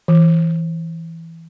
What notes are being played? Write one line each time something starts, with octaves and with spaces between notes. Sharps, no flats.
E3